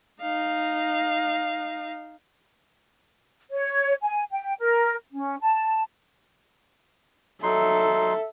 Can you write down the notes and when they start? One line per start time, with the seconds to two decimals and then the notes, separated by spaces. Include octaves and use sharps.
0.22 D#4 F5
3.51 C#5
4.02 G#5
4.31 G5
4.59 A#4
5.13 C#4
5.41 A5
7.43 F#3 D#4 A4 E5 C6